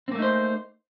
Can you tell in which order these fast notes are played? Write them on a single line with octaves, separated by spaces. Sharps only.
C4 A#3 A3 D#4 C5